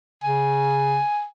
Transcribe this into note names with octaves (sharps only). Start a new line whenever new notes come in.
C#3 G#5